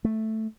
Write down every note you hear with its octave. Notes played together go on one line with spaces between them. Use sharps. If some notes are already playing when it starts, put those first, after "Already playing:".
A3